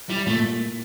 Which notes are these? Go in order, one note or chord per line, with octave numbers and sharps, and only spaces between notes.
G3 E4
A#2 A3